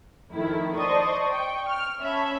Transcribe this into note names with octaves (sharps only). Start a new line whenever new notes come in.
F2 D#3 A3 E4
C5 D5 D#5 A5 C#6 D#6
G5 C#6
F6
C#4 C#5 E5 A5 B5